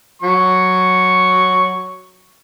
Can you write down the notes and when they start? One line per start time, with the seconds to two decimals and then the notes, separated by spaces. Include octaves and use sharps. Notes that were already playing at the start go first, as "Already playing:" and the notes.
0.23 F#3 C#6